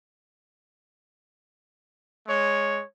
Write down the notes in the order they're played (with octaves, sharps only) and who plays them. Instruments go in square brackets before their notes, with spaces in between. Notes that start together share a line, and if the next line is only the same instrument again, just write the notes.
[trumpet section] G#3 C#5